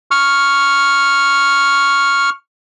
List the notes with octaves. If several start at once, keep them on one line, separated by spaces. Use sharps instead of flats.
C#6 F6